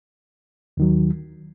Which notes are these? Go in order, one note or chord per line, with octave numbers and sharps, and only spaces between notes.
D#2 D#3 F#3